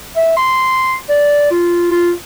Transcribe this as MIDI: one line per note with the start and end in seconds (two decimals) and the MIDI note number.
0.16 0.32 76
0.37 0.96 84
1.09 1.51 74
1.51 1.88 65
1.91 2.11 65